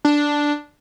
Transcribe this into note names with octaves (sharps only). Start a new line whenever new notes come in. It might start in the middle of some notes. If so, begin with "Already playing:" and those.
D4